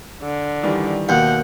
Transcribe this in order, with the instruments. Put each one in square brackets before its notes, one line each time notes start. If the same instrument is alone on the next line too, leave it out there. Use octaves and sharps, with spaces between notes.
[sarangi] D3
[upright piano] D#3 E3 G3
[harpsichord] D#2 [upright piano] B2 G6 [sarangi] F#5